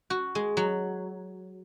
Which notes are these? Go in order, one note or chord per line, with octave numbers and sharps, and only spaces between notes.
F#4
G#3
F#3